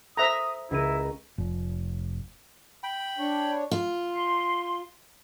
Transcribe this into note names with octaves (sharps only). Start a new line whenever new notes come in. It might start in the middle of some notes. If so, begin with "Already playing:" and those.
A4 C5 E5 A#5 B5 D#6
C#2 E4 A#4 D#7
F1
G5 B5
D4 C#5
F4
C6